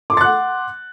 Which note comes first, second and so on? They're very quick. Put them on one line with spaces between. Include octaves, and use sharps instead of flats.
D6 C6 A6 F#6 F#5